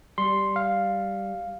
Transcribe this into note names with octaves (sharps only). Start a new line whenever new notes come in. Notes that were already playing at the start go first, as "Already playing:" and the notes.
G3 C6
F5